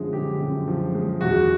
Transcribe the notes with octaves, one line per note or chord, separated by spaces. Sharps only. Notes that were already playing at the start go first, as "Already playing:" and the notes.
Already playing: F#2 D3 F3 G#3
D3 G4
F#2
F3
G#3
E2 F#4